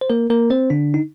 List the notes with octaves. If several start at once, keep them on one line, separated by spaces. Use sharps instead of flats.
C5
A#3 A#4
A#3 A#4
C4 C5
D3 D4
D#4